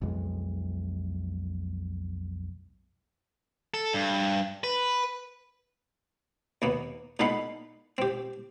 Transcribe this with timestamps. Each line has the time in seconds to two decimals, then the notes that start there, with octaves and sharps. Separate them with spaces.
0.02 B1 F2 E3 G#3
3.74 A4
3.93 G2
4.64 B4
6.62 D#2 A#3 B3
7.19 A#2 D#4 A4 F#5 B5 C6
7.98 C4 G4